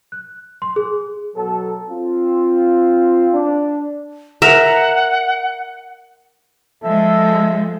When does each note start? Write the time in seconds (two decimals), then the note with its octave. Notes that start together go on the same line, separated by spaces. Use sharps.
0.12 F#6
0.62 C6
0.76 G#4
1.36 B2 F#3 A4
1.90 C4 F4
3.33 D4
4.42 A#4 E5 F#5
6.83 F3 G#3 A4 E5